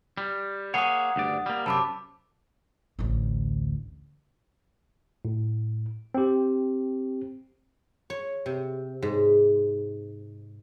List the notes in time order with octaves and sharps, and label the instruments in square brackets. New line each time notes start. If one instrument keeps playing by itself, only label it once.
[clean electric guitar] G3
[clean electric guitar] A#3 G#4 C#5 [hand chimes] F#5 D#6
[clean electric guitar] D2 G2 D5
G3 A#3
[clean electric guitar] F#2 C3 C4 [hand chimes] A5 B5 D6
[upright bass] A1 D2
[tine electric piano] A2
C4 G4
[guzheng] C#5
C3
G#2